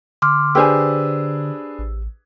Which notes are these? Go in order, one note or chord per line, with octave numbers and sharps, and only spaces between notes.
D3 C6 D6 F6
D4 G4 G#4 B4 C5 G#5 E6
A1